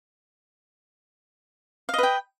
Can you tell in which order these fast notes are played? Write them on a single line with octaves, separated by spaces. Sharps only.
F5 D#5 B4 G5